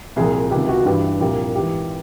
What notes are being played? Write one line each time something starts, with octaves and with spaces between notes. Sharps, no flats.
C2 A#2 F3 G#4
C#2 C3 D#3 G4
F#4
G2 E3 G4
C2 A#2 F3 G4
G#2 E3 G4